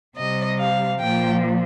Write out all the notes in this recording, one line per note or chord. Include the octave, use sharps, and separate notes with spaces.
C3 G3 D#5
F5
A#2 F3 G5